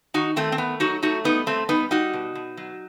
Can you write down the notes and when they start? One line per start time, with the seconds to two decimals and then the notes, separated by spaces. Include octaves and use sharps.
0.14 D#3 D#4 F#4
0.36 D#3 A3 C4
0.52 C4
0.58 A3 B3
0.80 F#3 D#4 F#4
1.02 A3 D#4 F#4
1.24 G3 B3 D#4
1.46 B2 A3 C4
1.69 G3 B3 D#4
1.91 G3 D#4 F#4
2.13 B2
2.35 B2
2.57 F#3